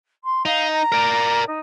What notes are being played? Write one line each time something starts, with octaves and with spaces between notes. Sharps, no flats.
C6
D#4 F5
A#5
A#4 D5
D#4